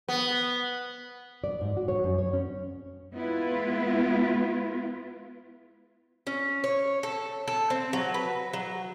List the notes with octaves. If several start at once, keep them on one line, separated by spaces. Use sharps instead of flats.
B3
D5
G#2
F#4
C#5
F#2
C#5
C#4
G#3 B3 E4 F4 B4
C#4
C#5
A4
A4
C4
F#3
B4
F#3